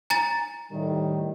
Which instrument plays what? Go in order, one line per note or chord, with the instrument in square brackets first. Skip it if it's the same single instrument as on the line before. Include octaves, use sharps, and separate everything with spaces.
[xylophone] G#5 A#5 A6
[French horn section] A2 D#3 G3